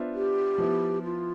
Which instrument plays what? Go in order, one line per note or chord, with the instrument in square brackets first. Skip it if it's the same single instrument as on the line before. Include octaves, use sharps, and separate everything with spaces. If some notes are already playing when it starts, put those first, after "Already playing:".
Already playing: [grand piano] B3 D4 F4 C5 E5
[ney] G4
[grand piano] F3 B3 E4
[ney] F4